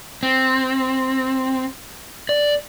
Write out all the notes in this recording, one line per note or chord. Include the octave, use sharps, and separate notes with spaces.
C4
D5